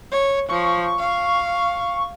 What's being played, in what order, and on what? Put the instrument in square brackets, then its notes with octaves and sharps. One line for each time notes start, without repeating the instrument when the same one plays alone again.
[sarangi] C#5
[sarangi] F3 [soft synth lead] C#6
[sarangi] F5